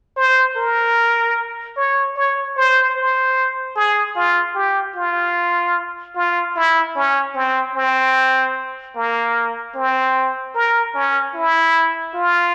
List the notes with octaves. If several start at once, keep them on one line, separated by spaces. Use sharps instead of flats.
C5
A#4
C#5
C#5
C5
C5
G#4
F4
G4
F4
F4
E4
C#4
C4
C4
A#3
C4
A#4
C#4
E4
F4